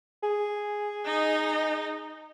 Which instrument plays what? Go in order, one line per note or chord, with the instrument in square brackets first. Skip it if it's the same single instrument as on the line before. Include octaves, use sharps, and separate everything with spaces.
[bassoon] G#4
[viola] D#4 D#5